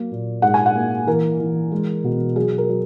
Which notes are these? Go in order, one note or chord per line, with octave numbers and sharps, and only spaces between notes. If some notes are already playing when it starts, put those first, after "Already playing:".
Already playing: F#3 A#3
A#2
G#2 F#5
G#5
F#5
A#3
E3 A#4
E3
G#3
B2
F#3 G#4
A#4
F#3